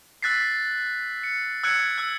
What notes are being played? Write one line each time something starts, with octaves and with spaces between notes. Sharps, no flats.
E6 F#6 A6 B6 C7
C#7
E6 F#6 G#6 C#7 D7
E6 F#6